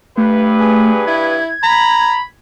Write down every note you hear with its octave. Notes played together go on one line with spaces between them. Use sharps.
G2 A3 B4
G#4
E4 G#6
A#5 B5